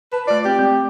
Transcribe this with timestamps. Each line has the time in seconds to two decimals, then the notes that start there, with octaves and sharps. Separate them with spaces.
0.13 B4 A5
0.27 A3 F4 D5
0.45 C4 G4
0.59 G#3 C4